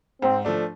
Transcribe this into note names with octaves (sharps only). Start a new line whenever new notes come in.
G#2 C4
F3 A3 D4